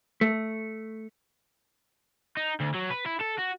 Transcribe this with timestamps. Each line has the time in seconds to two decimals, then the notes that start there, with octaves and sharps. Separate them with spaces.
0.21 A3
2.37 D#4
2.61 D2
2.75 F#3
2.91 B4
3.06 E4
3.21 A4
3.39 F#4